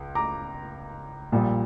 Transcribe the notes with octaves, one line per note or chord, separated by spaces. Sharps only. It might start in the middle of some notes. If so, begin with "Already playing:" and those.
Already playing: C#2
A#5 D6
A#1 A#2 G3